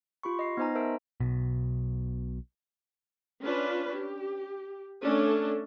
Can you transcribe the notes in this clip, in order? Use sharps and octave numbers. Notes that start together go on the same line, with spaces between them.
F4 G4 B5 C#6
D#5 C7
B3 D#4 C5 D#5 G#5 A#5
A#4 C5 E5 A5 E6 D7
B1 B2
C#4 D4 F4 B4
G4
A3 C#4 D4 A4